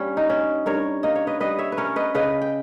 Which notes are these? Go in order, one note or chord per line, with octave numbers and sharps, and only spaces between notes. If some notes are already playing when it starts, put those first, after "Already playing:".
Already playing: G2 G3 A#3 C#4
D#4
C#4
G2 A#4 C#5
A#3 D#5
C#5
B4 D#5
G3 B4 D#5
C#5 E5
B4
C#4 A#4 C#5
B4 D#5
C#3 B4 D#5
G5